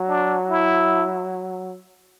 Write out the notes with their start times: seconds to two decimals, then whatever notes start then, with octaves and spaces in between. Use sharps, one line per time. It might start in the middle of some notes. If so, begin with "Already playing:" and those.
Already playing: F#3
0.08 D4
0.49 E4